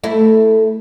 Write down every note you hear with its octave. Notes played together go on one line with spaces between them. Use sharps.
A3 E4